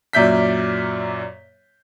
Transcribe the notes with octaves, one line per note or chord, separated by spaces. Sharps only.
F#2 A#2 D5 E5 G6 B6